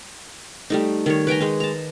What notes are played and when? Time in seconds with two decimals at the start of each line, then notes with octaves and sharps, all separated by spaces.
0.70 G3 A3 D#4
1.06 D#3 G3 C#5
1.27 B4 G5 G#5 A#5
1.40 G#3 D#4
1.60 A5 A#5